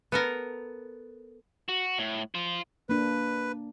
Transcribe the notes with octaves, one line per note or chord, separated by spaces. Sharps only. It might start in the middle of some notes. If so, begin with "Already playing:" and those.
B3 A4 A#4
F#4
A2
F4 C5
A#3 D4 B4